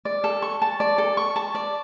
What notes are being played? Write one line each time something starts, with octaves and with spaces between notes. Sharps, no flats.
D5
A4
C#6
A5
D5
A4
C#6
A5
D5